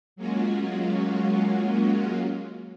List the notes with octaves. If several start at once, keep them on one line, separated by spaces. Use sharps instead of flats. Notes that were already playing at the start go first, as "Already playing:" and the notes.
F#3 G#3 A#3 C#4 F4 F#4